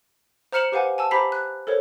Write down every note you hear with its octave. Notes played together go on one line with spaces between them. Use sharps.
C5 A#5 F6 C#7 E7 F#7
G4 B4 C5 F5 F#5 G#5
G#5 A5 E6
G4 C5 A#5 B5 B6 C7
F#6
A4 A#4 C5 C#5